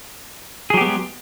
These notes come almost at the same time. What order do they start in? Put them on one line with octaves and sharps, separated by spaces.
G#4 F#3 G4 B3 G#3